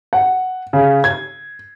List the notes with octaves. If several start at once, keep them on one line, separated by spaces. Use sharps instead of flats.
F#5
C#3
G#6